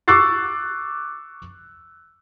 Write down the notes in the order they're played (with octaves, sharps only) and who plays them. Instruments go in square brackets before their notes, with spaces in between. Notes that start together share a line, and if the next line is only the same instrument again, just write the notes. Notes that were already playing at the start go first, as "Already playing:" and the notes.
[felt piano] C#6 D6 E6 F#6 A6 C7